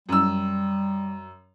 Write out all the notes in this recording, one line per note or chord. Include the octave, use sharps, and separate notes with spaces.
F#2 G3 E6